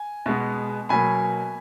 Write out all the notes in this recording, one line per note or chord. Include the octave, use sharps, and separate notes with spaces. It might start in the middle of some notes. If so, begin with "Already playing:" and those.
Already playing: G#5
B2 G#3 B3
B2 F#3 A#3 G#5 B5